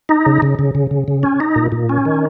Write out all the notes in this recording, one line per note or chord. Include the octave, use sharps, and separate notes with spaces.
D#4
C#3
C#3
C#3
C#3
C#3
C#3
C#4
D#4
A#2
A#2
C#4
D#3